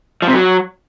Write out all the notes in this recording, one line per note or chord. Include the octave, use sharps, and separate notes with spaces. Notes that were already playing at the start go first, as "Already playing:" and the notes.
F3
C3
F#3